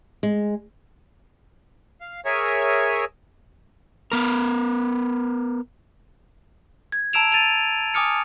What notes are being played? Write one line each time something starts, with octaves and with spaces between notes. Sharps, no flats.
G#3
F5
G#4 A#4 C#5 E5 G#5
B3 A#4
G#6
A5 A#5 E6 D7 E7 F7
A6 D#7 F7
G#5 D6 D#6 F6 C#7